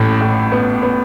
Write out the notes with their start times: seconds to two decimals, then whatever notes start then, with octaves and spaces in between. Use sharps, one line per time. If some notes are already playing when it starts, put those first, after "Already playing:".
Already playing: A1 A2
0.21 A2
0.52 B3
0.82 B3